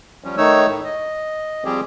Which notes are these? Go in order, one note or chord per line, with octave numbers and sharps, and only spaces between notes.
F3 G3 C#4
D#3 A3 D#4 C#5 E6
A2 D#3
D#5
F3 G3 C4 G4 G#4